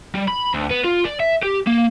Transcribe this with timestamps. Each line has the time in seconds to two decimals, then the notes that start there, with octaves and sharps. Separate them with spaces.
0.15 G3
0.28 B5
0.54 D2
0.70 B3
0.85 F4
1.05 D5
1.20 E5
1.43 G4
1.67 A#3